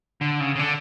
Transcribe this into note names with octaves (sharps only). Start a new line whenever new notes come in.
D3
C#3
C#3
D3